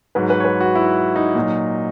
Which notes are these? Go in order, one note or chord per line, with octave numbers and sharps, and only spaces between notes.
G#2 F#3 B4
B4
C#5
B4
F#4
E4
D#4
A#2 F#3